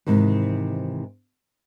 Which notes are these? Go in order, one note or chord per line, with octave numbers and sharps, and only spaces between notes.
G#2 C3 D#3 E3